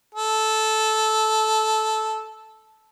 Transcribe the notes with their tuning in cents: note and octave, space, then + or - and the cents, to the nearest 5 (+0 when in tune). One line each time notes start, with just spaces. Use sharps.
A4 -10